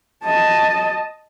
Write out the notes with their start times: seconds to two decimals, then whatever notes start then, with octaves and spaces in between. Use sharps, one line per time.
0.24 D#5 A5